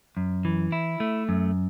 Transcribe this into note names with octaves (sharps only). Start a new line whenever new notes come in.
F#2
E3
E4
A3
F#2